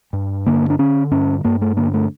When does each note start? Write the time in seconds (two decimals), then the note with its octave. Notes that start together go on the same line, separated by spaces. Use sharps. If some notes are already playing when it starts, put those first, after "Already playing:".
0.13 G2
0.47 D3 A#3
0.70 D4
0.79 D3 C#4
1.11 G2 C#4
1.44 G2 A#3
1.61 A3
1.77 D3 A#3
1.94 A3